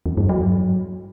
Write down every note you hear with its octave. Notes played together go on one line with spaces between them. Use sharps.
E2
G2
F#3